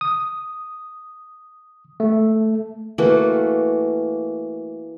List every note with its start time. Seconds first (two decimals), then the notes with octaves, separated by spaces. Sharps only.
0.01 D#6
2.00 A3
2.98 E3 A3 A#3 F#4